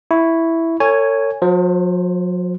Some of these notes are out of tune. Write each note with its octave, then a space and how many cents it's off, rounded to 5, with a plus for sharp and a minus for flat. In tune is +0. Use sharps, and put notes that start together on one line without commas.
E4 +0 C#6 +0
A4 +45 C#5 +5 G#5 -5
F#3 -45 C5 +0